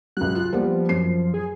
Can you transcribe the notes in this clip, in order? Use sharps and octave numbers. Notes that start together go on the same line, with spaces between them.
C#2 F#3 F#6
F4
F3 G3 A#3 B3
F#2 C7
G#4